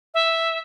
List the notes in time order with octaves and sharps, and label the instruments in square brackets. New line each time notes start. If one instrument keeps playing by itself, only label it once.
[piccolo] E5